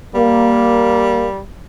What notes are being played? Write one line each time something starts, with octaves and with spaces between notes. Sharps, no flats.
G3 A#3